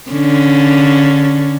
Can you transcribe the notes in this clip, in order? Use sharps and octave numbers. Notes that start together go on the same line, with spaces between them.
D3 C#4